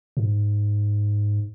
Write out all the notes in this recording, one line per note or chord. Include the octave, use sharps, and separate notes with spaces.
G#2